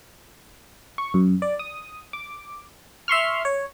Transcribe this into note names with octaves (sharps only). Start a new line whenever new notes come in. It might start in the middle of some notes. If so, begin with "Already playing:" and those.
C#6
F#2
D5
D#6
D6
E5 C6 C#6 F6
C#5